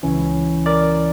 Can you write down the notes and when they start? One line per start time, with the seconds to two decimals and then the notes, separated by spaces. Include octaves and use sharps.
0.03 C#2 C#3 E3 C#4 E4
0.66 A#4 D5